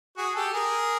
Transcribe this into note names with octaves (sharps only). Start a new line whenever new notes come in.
F#4 G#4
G4 A4
G#4 A#4